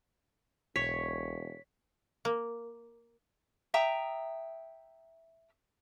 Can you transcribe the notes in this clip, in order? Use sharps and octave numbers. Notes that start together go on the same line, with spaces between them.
E1 B1 C#5 B6
A#3
E5 G5 A#5 D#6